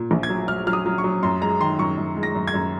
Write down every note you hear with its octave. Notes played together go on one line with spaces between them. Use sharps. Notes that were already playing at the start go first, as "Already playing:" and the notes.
Already playing: A#2
A#1
G#6
F#3
F#3 F6
F#3 F6
D#6
F#3
C#6
F#3
F#2 C6
G#3 A#5
D#3 C6
F#2 C#6
F#2
G#3
A#6
F#2
G#6
F#2